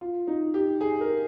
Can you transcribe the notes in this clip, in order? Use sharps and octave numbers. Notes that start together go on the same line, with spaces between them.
F4
D#4
G4
G#4
A#4